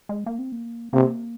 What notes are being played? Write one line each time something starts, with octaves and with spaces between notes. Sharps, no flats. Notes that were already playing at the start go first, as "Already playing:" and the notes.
G#3
A#3
C4
A#3
C3 A#3